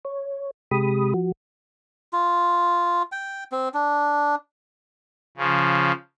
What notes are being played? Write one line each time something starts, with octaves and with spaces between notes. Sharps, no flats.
C#5
C3 G#3 G4 B5 D#6
F3 F#4
F4
G5
C4
D4
C#3 F3